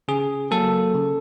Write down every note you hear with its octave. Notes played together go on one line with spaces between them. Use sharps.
C#3 G#4
F#3 A#3 A4
C#3